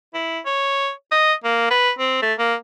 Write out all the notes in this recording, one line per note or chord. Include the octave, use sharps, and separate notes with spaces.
E4
C#5
D#5
A#3
B4
C4
A3
A#3